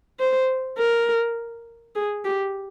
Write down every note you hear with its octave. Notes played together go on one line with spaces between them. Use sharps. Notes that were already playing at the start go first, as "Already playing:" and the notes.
C5
A#4
G#4
G4